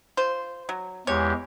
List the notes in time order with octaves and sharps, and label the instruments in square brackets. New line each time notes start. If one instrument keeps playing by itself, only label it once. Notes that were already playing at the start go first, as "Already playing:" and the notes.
[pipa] F4 C5
F#3
[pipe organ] E2 G#3 G4 [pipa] C#5